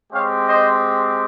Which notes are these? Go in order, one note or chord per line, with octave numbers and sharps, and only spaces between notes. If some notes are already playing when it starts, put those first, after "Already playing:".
G#3 C4 G4 C#5 F5
C5 D#5